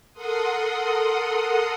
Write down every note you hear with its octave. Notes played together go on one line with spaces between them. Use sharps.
A4 A#4 F#5 C6 D#6